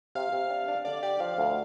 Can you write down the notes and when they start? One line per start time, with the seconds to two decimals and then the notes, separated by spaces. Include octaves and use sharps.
0.15 C3 F5
0.33 C3
0.50 D4
0.68 D4
0.85 D3 D5
1.03 G4 D5
1.20 F3 F5
1.38 D2